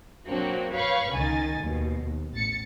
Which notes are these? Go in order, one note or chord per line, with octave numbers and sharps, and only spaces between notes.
F#3 A#3 C4 D4 F#4
B4 C#5 F5 B5 C#6 G6
C#2 D#3 G#5 A6
D#2 B2
D#2
A1 A6 C#7